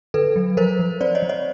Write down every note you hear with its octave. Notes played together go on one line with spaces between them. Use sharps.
D3 A4 B4
F#3
F3 A#4 C5
F3
C4 C5 D5
C#5 D#5
F3
C#5 D#5